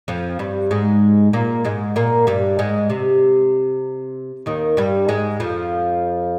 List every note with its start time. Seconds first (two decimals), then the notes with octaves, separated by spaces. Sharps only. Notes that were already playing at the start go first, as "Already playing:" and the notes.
0.08 F2 F3
0.39 G2 G3
0.71 G#2 G#3
1.33 A#2 A#3
1.65 G#2 G#3
1.96 A#2 A#3
2.27 G2 G3
2.59 G#2 G#3
2.90 C3
4.46 D#2 D#3
4.77 G2 G3
5.09 G#2 G#3
5.40 F2 F3